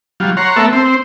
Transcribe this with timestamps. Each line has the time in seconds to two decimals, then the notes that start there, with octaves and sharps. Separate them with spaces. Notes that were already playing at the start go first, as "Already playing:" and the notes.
0.20 F#3 G3 F4
0.37 C#5 F#5 A#5 C6
0.56 A3 B3 A4 A#4 E5
0.73 C4 C5